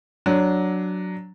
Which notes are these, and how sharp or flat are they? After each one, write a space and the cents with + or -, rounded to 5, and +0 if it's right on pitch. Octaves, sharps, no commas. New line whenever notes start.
F#3 +0 D4 -5